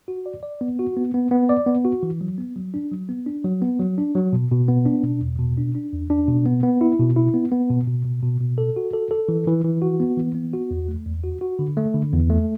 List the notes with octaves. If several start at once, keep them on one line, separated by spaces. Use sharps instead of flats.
F#4
D5
D5
B3
F#4
B3
B3
B3
D5
B3
F#4
E3
F#3
B3
F#3
D4
F#3
B3
D4
F#3
B3
F#3
D4
F#3
B2
B2
B3
D4
B2
E2
B2
D4
D4
E2
D4
B2
B3
B3
E4
B2
E4
B3
B3
B2
B2
B2
B2
B2
A4
F#4
A4
A4
E3
E3
E3
F#4
B3
E3
B3
F#4
E2
A3
E2
F#4
F#4
D3
A3
D3
E2
A3